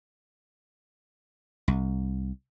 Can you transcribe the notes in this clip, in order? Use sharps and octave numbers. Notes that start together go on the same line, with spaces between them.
C2